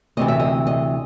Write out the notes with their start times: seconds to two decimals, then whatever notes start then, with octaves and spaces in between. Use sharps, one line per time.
0.17 D2 C3 E3 D#5
0.28 E5
0.40 D#5
0.67 D#5